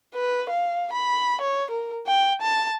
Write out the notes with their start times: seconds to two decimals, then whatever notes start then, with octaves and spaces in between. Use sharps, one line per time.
0.15 B4
0.50 F5
0.93 B5
1.41 C#5
1.71 A#4
2.07 G5
2.42 A5